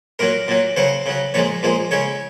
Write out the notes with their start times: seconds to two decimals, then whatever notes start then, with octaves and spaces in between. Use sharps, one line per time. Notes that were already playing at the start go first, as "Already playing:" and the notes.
0.19 A#2 F#3 A#4
0.48 A#2 F#3
0.76 C#3 F#3 C5
1.06 C#3 F#3
1.34 A#2 F3 G#3 C#5
1.63 A#2 F3 G#3
1.91 C#3 G#3 C#5